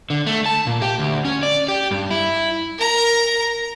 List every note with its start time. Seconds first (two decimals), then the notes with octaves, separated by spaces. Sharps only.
0.10 D3
0.27 A3
0.46 A5
0.67 A#2
0.82 G4
0.99 D2
1.25 C#4
1.43 D5
1.68 G4
1.91 G2
2.11 E4
2.78 A#4 A#5